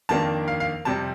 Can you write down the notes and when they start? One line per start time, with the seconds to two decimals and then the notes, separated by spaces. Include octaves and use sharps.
0.09 F2 D#3 A#3 D4 A5
0.48 F5
0.60 F5
0.85 F2 C3 G3 A5